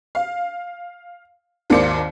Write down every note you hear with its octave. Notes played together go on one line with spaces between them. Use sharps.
F5
G#1 D#2 A#3 C5 D5 C#7